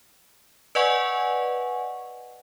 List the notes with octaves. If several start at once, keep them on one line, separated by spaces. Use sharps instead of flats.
B4 D5 D#5 F#5 G#5 C#6